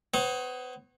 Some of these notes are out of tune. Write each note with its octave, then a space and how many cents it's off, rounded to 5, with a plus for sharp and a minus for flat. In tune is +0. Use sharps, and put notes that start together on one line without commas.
B3 +30 C#5 -40